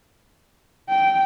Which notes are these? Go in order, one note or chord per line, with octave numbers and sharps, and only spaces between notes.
G5